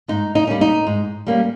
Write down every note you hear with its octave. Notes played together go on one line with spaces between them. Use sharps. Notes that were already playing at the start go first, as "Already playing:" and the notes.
G#2 D#4
D#4
G3 A#3 C#4
D#4
G#2
G3 A#3 C#4